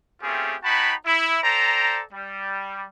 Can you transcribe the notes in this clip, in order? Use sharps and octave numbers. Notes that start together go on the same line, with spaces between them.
A3 C4 C#4 F4 G4 G#4
D#4 F#4 G5 A5 B5
E4
A4 C5 D5 G5 A#5
G3